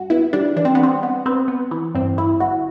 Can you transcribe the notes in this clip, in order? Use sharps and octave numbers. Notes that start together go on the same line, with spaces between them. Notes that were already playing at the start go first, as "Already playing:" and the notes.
Already playing: G2 F#4
B3 E4
G3 D4
E3 D4
C4
B3
G3 C4
B3
B3 C4
B3
E3
G2 C4
G2 E4
G1 F#4